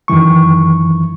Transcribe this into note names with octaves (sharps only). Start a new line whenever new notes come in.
F#2 D#3 E3 C#6